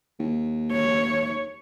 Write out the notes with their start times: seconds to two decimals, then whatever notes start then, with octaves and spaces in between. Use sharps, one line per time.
0.19 D#2
0.72 C#5